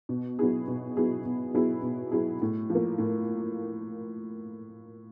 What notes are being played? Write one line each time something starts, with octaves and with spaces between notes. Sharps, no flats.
B2
F#3 B3 E4 G#4
B2
F#3 B3 E4 G#4
B2
F#3 B3 E4 G#4
B2
F#3 B3 E4 G#4
A2
F3
A#3
A2